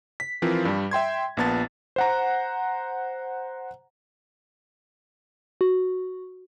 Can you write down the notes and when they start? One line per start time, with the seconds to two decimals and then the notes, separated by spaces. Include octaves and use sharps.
0.20 B6
0.42 E3 F3 C4 F4 A#4
0.65 G2 G3
0.91 E5 G5 C6 G#6
1.37 A#1 A#2 B3 A5 A6
1.96 C5 F#5 A#5
5.61 F#4